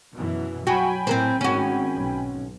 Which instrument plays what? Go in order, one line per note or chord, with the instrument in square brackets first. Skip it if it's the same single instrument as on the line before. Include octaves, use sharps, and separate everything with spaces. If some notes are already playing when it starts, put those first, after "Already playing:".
[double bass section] F#2 B2 E3
[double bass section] F#3 [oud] F#4 [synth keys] G5 G#5 B5
[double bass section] A2 [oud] C4 A#4 C5
[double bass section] G#1 D#3 [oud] C#4 F#4
[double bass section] B1